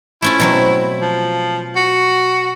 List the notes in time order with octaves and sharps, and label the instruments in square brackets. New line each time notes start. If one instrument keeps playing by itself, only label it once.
[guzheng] A3 C#4 F4 [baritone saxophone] E4
[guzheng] B2 F#3 C4
[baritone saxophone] F3
F#4